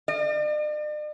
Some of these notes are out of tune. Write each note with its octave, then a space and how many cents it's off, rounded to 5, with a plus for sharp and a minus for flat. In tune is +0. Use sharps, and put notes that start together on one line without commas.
D5 +45